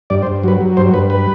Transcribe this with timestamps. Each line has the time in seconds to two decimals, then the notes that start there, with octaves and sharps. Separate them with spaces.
0.10 G2 D5
0.22 C5
0.27 G2
0.43 F#3 B4
0.61 F#3
0.77 G2 C5
0.94 G2 B4
1.10 B4